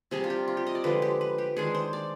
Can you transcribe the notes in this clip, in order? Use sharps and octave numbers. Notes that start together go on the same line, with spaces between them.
C3 G3 D4 G#4
F4
G4
F4
G4
D#5
D5
D3 F3 G#3 B4
G4
B4
G4
D#3 G#3 D4 G#4
C5
D5